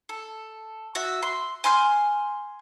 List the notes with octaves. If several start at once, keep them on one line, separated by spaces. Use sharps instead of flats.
A4
F#4 E5
C6
G#5 C6 F6 G6